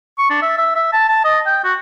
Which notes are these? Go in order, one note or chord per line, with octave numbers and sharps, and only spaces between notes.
C#6
D4
E5
E5
E5
A5
A5
D#5
G5
F#4